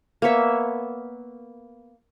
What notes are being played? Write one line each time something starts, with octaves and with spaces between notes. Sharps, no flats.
A#3 B3 C#5 E5